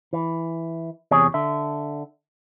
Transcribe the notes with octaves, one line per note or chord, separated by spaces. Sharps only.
E3
E2 C3 G#4 C#5
D3 E5